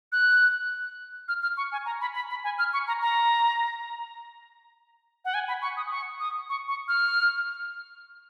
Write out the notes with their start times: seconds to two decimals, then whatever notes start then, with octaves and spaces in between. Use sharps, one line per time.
0.12 F#6
1.28 F6
1.43 F6
1.57 C#6
1.72 G#5
1.86 A#5
2.01 B5
2.15 B5
2.30 B5
2.44 G#5
2.59 F6
2.73 C#6
2.88 A#5
3.02 A#5
5.25 F#5
5.34 G#5
5.48 B5
5.62 C#6
5.77 D#6
5.91 C#6
6.20 D#6
6.49 C#6
6.68 C#6
6.88 F6